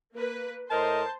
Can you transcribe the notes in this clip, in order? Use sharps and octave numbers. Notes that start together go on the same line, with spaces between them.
A#3 B4
A2 A#4 C5 D#5 A5